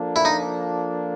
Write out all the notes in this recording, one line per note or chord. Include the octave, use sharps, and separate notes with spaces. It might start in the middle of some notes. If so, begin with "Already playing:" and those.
Already playing: F3 A#3 D4 F4 A4
E4
D#4